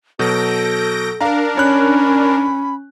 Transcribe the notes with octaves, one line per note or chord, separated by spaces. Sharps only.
B2 F#3 A4 G6 A#6 D7
D4 A#4 F5 A#5
C#4 C#5 B5 F#6